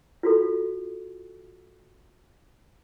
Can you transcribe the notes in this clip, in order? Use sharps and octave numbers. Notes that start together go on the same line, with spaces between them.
F4 F#4 A4